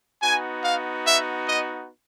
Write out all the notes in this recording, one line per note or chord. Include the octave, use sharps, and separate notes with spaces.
B3 D#4 F#4 G#5
F5
E5
D#5